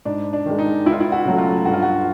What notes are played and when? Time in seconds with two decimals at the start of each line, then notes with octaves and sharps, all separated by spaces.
0.05 G#2 D4
0.33 D4
0.46 D#3 G#3
0.59 D#4
0.85 C#2 E4
0.93 F4
1.00 E4
1.12 F#4
1.25 C#3 F#3 A3
1.38 F4
1.65 G2 F#4
1.73 F4
1.82 F#4